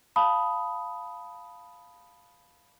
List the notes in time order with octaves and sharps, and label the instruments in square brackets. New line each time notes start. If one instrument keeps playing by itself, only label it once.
[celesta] F5 A5 B5 D#6